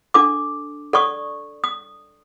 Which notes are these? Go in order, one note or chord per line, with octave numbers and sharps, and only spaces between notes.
D4 A4 D6
A4 D5 C#6 D#6
D#6